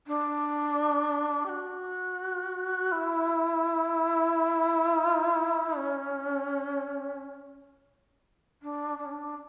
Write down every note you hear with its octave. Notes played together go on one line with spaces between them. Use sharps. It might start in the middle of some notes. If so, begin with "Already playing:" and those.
D4
G4
F#4
E4
C#4
D4
D4
C#4
D4